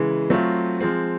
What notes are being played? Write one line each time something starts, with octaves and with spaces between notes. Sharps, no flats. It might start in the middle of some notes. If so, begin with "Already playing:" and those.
Already playing: C#3 E3 G#3
F#3 A3 C4 F4
F3 G#3 C4